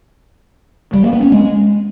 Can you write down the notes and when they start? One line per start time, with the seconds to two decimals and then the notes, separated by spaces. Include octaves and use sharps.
0.93 G3
1.03 A#3
1.13 B3
1.22 C#4
1.32 G#3